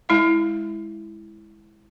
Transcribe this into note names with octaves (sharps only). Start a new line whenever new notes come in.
G#3 E4 F5